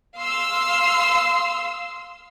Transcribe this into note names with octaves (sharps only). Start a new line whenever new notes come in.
F5 C6 E6